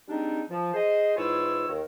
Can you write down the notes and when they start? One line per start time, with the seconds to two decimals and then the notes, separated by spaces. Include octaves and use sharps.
0.09 G3 G#3 C4 D4 D#4
0.50 F3
0.74 G#4 C5 D#5
1.17 G#2 E3 E4 F4 C#5 E6
1.68 D#2 D#3 A#4